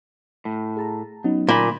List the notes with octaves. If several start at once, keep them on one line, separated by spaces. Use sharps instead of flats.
A2
G#4 A5 A#5
F#3 B3 C#4 D#4
D2 A#2 B5